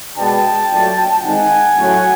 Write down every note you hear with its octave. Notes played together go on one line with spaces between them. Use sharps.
B2 G#3 B3 D4 G5 A5
A#2 F#3 A3 D4
D#3 G#3 C4 D#4 F#5 G#5
A2 F#3 A3 C#4